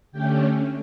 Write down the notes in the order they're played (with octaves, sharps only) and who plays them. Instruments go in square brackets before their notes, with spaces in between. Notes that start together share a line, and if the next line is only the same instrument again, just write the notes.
[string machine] D3 A3 C#4 G4 G5